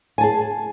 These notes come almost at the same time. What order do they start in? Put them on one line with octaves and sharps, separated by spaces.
G#5 A5 G#4